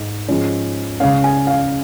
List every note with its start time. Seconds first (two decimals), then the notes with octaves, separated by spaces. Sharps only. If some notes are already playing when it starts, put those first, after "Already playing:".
Already playing: G#2 G#3
0.28 G#2 F3 G#3 C#4
1.00 C#2 C#3 G#3 C#4 F5
1.24 G#5
1.47 F5